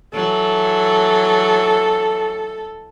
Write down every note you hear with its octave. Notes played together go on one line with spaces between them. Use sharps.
E3 F#3 A4